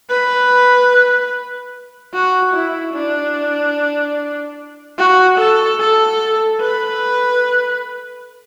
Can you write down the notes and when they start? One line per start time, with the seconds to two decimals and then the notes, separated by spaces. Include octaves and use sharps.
0.10 B4
2.14 F#4
2.54 E4
2.94 D4
4.98 F#4
5.38 A4
5.80 A4
6.60 B4